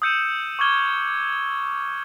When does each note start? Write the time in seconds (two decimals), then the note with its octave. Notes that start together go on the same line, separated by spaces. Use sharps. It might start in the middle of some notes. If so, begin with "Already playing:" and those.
0.02 D#6 E6 G6 C#7 D#7 E7
0.59 C#6 D6 F6 G#6 G7
0.88 G7